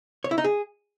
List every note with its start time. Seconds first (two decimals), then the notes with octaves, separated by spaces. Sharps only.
0.24 C#5
0.31 E4
0.38 D#4
0.44 G#4